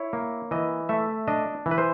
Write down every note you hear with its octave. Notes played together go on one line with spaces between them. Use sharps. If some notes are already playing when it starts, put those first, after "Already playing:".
Already playing: E4 C#5
A#3
E3 D#5
A3 E5
D4 D#5
E3
B4
C5